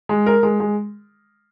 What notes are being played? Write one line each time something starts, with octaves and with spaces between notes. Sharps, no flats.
G#3
A#4
G#3
G#3